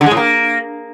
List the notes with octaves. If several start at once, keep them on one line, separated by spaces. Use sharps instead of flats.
D3
G#3
A2
A#3